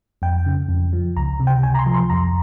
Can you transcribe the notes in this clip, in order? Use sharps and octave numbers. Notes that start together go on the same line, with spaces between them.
F2 G5
C#3
F2
F3
C#2 A#5
C3
G5
C#2 G#5
A#5
C6
F3
C6
F2 A#5